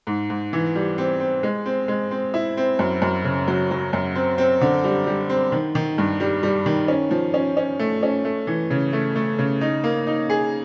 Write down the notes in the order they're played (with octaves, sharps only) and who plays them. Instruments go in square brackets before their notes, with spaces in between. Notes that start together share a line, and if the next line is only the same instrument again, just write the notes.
[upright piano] G#2
G#2
E3
G3
C4
C4
G#3
C4
G#3
C4
E4
C4
F#2
F#2
C#3
F#3
F#3
F#2
C4
C4
D3
G3
G3
C4
D#3
D#3
G2
G3
G3
D#3
C#4
F3
C#4
C#4
A3
C#4
A3
E3
C#3
A3
A3
C#3
D#4
A#3
D#4
G#4